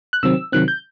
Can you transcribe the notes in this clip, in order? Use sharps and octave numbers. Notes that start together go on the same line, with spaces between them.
F#6
C3 D#3 F#3 C4 E6
C3 D#3 F#3 C4 F#6
G6